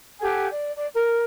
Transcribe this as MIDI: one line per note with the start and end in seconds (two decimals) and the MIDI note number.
0.21 0.46 67
0.21 0.46 69
0.21 0.46 78
0.21 0.46 80
0.51 0.72 74
0.75 0.87 74
0.94 1.24 70